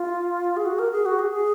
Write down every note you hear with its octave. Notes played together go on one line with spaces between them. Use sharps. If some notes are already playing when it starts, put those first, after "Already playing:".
Already playing: F4
G#4
F#4
A#4
G#4
F#4
G#4
G#4